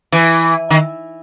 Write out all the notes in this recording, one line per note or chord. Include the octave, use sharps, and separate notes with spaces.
E3
D#3